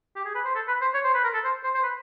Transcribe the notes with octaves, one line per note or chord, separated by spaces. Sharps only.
G4
G#4
B4
C5
A4
B4
C5
C#5
C5
B4
A#4
A4
C5
C5
C5
B4